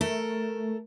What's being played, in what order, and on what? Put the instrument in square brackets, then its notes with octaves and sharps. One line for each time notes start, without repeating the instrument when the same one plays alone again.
[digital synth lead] A3 [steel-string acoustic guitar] A4 A#4